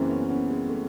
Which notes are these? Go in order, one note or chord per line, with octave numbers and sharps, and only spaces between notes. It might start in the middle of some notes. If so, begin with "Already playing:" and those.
Already playing: F#2 C#3 E3 A#3 C4
B3 C#4
B3 C#4
G#3
A3